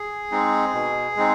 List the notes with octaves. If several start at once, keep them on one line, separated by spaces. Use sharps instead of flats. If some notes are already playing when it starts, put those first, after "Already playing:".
Already playing: G#4
G#3 C4 D#4
B2
G#3 C4 D#4